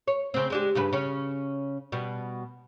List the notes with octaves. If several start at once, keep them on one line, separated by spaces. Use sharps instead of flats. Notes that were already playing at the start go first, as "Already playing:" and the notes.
C#5
C#3 C4
G#3 D4 G4
G2 C#3 B4
C#3 C#4
B2 G3